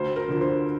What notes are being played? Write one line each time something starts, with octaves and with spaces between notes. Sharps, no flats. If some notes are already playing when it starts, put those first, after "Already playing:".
Already playing: D2 C5
A#4
D3 F3
C5